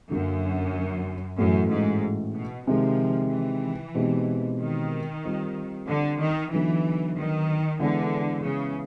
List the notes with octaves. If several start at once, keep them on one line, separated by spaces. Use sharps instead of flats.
F#2 D3 F#3 A#3
F#2 A2 E3 A3 C#4 F#4
G#2
B2
C3 D#3 F3 G#3
E3
B2 G#3 C4 D#4 G4
D#3
G3 C4 F4
D3
D#3
D3 E3 F#3 B3 D#4
D#3
D3 E3 G#3 B3 E4
C#3